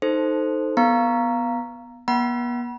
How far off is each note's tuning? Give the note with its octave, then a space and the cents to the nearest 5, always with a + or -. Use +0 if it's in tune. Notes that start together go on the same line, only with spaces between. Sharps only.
D#4 +0 A4 +0 C5 +0
B3 -5 F5 -5 A#5 +0
B3 -40 F#5 +30 B5 -35